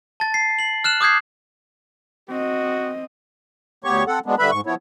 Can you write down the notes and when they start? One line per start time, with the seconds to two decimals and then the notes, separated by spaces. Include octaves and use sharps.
0.20 A5 A6
0.34 C7
0.59 C7 F#7
0.84 F6 F#6 E7 F#7
1.01 D6 D#6 G6 G#6 C7
2.29 C4 F#4 D#5
3.84 D2 B3 G4 C#5 C#6
4.07 C4 A4 F#5
4.26 F#3 G#3 B3 D4
4.39 D3 G3 B4 E5 B5
4.51 G#2 C#6
4.66 F3 B3 E4 C#5